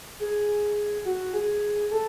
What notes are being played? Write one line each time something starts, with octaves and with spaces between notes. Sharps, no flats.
G#4
F#4
G#4
A4